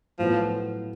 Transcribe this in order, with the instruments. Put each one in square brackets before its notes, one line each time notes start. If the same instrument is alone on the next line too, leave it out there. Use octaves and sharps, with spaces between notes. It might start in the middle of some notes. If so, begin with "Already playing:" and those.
[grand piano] A2 F#3 B3 [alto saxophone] F3